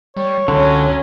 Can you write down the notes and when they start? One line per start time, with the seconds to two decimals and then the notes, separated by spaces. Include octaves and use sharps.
0.17 G3 C#5
0.48 C#2 D3 F#3 C#4